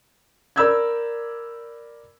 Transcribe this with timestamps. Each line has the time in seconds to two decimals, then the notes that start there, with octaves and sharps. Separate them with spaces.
0.56 A#4 D5 B5 E6 G6 G#6